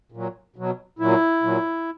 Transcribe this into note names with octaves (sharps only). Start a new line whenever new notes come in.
A#2 F#3
B2 F#3
A#2 F#3 E4
A#2 F#3